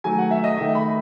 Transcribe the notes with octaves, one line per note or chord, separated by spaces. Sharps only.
D#3 F#3 A3 G#5
F#5
E5
D#5
D#3 A3 E5
B5